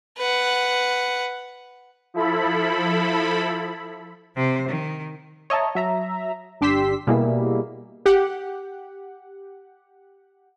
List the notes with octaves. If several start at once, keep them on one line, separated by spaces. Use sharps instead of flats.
B4 F#5
F3 E4 A4 B5
C3 C5
D#3
C#5 D#5 E5 A5 A#5
F#3 E5 A#5
G1 D4 G4 C6 E6 B6
B2 G3 A#3 E4 G#4
G4 F#5